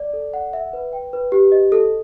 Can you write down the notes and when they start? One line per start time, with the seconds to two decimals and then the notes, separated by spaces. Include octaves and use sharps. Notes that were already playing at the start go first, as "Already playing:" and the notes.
Already playing: D5
0.13 A4
0.34 F#5
0.53 E5
0.73 B4
0.93 G5
1.13 B4
1.32 G4
1.52 D#5
1.72 A4